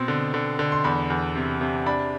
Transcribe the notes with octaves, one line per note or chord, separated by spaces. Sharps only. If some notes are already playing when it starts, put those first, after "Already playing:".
Already playing: B2 C4
D3
D3
D3
C6
E2 B5
E2
C3
C3
D4 B5